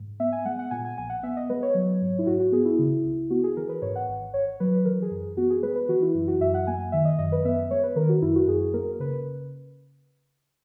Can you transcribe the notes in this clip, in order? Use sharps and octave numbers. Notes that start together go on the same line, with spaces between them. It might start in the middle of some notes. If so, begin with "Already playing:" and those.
Already playing: G#2
B3 E5
G#5
G#3 F#5
F#5
A#2 G#5
G#5
A#1 G#5
F#5
B3 E5
D#5
G#3 B4
C#5
F#3
G#2
E4
G#2 F#4
F#4
B3 G#4
E4
C#3
C#2
B3 F#4
G#4
E3 A#4
B4
G#2 C#5
F#5
G#1
G#1 C#5
F#3 B4
E3 A#4
G#4
F#2
B3 F#4
G#4
G#3 B4
B4
E3 F#4
E4
F#2 E4
F#4
F#2 E5
F#5
A#3 G#5
D#3 E5
D#5
F#2 D#5
B4
B3 E5
G#3 C#5
B4
D#3 A#4
F#4
F#2 E4
F#4
F#2 G#4
A#3 A#4
C#3 B4